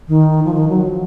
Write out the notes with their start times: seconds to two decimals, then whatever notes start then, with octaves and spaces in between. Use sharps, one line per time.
0.08 D#3
0.45 F3
0.54 D#3
0.69 F#3
0.84 F3